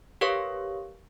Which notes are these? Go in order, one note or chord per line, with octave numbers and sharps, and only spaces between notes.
G4 A#4 B4 C#5 F5 C#6